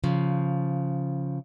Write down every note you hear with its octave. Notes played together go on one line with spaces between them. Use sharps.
C#3 F3